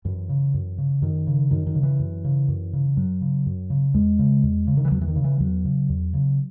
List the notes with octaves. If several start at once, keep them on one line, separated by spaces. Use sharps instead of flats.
F#2 E3
C#3
F#2
C#3
F#2 D#3
C#3
F#2 D#3
D#3
C#3
E3
F#2
C#3
F#2
C#3
F#2 F#3
C#3
F#2
C#3
E2 G#3
C#3
E2
C#3
D#3
E3
E2 F#3
E3
D#3
C#3
E3
E2 F#3
C#3
E2
C#3